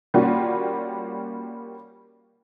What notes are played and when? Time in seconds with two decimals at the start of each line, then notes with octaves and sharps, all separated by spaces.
0.14 G3 A#3 C#4 F4 F#4